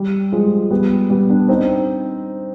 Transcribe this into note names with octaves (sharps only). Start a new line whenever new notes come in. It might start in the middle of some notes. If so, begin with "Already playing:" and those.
Already playing: G3
F3 G#3
G3 B3
G3 B3
B3 D4
C4 D#4